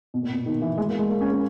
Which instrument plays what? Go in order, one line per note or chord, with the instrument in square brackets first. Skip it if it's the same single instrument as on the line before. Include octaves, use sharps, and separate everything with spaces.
[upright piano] B2
A#2
B2
D#3
E3
G#3
A#3
G#3
A#3
C#4
A#3